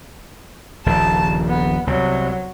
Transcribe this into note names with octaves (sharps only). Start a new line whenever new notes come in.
D#1 A#1 C#3 A5
B3
C2 C3 F#3